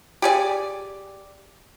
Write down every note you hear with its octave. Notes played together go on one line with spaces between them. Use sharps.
G4 G#4 D5